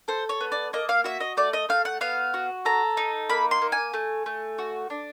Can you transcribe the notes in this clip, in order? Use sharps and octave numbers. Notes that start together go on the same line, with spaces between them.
A4 C5
C#5
B3
D5
A#3 D#5
F5
F#4 E5
D#5
A3 D5
D#5
A3 F5
F#5
B3 F5
F#4
A4 A#5
D#4
A#3 B5
C6
A#3
G#5
A3
A3
F#4
D4